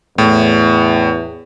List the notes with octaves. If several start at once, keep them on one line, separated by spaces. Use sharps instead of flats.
E2 A2